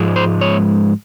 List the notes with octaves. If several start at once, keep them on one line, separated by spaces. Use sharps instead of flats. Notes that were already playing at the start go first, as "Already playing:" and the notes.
Already playing: G#2 F3 G#3
C5
C#5